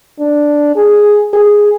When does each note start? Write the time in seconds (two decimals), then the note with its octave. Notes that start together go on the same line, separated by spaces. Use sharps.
0.20 D4
0.76 G#4
1.34 G#4